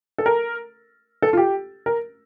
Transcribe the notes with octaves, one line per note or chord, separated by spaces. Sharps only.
A4
A#4
A4
F4
G4
A#4